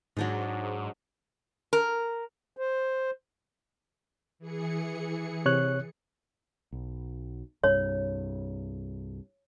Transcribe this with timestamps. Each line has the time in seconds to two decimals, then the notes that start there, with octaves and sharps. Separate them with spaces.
0.17 G#2 F#3 D4 D#4
1.73 A#4
2.57 C5
4.39 E3 G#4 C#7
5.46 C3 C#5 F#6
6.72 B1
7.64 C2 G2 C#5